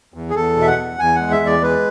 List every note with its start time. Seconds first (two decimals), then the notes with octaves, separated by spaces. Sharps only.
0.14 E2
0.30 G#4
0.36 E2 A4
0.56 B2
0.62 E5
0.67 F#5
0.78 E2
0.99 E2 G#5
1.15 G#3 F#5
1.31 E5
1.40 E2
1.46 D5
1.62 G#3 B4